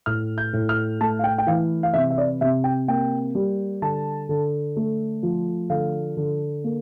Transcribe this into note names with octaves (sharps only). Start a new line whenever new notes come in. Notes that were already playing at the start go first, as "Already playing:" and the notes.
A2 F6
G6
A2
F6
A3 A5
F5
G5
G5
E3 F5
F5
C3 E5
E5
D5
C3 E5
G5
A#3 G5
G3
D3 A5
D3
A3
F3
D3 F5
D3
A#3